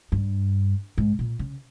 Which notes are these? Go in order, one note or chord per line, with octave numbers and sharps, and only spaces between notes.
G2
G#2
A#2
C#3